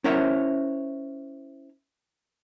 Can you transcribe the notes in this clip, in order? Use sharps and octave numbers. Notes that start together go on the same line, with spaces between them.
C#4 E4 A#4 C5 C#5 E5